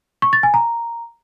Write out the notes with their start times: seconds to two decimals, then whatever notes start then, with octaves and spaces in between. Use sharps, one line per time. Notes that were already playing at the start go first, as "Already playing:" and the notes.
0.22 C#6
0.33 A6
0.43 G#5
0.54 A#5